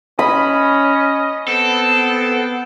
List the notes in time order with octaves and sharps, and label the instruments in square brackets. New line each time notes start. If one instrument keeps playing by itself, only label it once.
[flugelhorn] C#4 [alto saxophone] D#5 [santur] B5
[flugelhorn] B3 [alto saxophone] C4 [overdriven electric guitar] A4